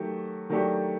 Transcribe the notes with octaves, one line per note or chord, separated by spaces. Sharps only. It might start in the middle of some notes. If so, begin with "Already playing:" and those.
Already playing: D#3 F#3 A3 G4
D#3 F#3 A3 D4 G4